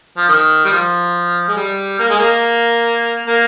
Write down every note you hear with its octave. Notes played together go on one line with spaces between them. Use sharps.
F3
D#3
G3
F3
G#3
G3
A#3
G#3
A#3
A#3